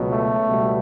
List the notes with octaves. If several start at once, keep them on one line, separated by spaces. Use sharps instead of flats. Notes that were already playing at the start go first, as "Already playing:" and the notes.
Already playing: C#2 B2 F#3
A3
C#2 B2 G3